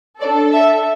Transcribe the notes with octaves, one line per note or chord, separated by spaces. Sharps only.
D4 A4 D5
E5